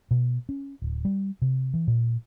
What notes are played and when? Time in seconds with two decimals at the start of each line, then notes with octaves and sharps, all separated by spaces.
0.11 B2
0.49 C#4
0.82 D1
1.05 G3
1.42 C3
1.74 E3
1.87 A#2